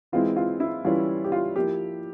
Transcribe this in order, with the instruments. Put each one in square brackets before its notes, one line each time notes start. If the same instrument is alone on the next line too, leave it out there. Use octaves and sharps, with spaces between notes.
[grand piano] E3 G#3 C4 E4 [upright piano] F4
[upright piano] F4
E4
[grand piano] E3 G3 C#4 E4 [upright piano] F4
[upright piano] G4
F4
[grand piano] F3 A#3 E4 [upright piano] G4